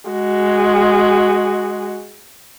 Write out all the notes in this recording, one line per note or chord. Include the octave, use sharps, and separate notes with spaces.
G#3 F#4